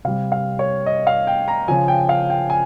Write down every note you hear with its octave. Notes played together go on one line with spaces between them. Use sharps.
C3 G3 F5
F5
C#5
D#5
F5
G5
A#5
C#3 F3 G#5
G5
F5
G5
G#5